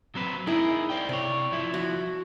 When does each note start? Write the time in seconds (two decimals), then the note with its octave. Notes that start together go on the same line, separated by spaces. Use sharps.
0.15 F#3 C4 B4
0.47 D#4 E4 G#4 A#4
0.90 C5 D5 G5
1.09 C3 C#5 D5
1.52 F3 E4
1.74 F#4